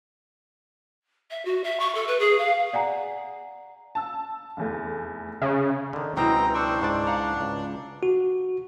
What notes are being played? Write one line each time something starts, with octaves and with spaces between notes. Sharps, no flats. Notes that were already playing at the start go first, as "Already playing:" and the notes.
E5
F#4
E5
C#6
A4
B4
G#4
F5
D5 F#5 G#5 A#5
A5 E6
F1 E2 A3
C#3
D3 D#3
C#2 B2 C4 D#4 E4 F#4 G5 A#5
D4 C5 G5 C#6 E6
G#2 D4 C5 D5
F5 F#5 A#5
C#2
F#4